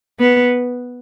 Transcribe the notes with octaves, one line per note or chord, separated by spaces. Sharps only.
B3